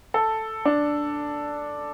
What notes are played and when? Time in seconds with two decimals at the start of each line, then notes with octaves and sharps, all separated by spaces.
0.14 A4
0.65 D4